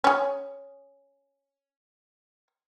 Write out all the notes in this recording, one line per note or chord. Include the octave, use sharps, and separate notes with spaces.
C#4 G#4